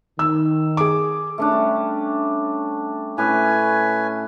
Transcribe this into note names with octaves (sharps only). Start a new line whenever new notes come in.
D#3 E6
G#4 D6
A3 C#4 D4
G3
A2 C#4 B4 G#5